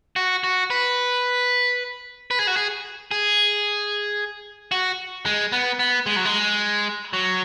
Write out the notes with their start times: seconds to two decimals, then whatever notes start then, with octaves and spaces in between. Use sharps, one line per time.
0.16 F#4
0.44 F#4
0.70 B4
2.31 B4
2.39 G#4
2.47 F#4
2.56 G#4
3.11 G#4
4.72 F#4
5.26 G#3
5.52 B3
5.79 B3
6.06 G#3
6.16 F#3
6.25 G#3
7.13 F#3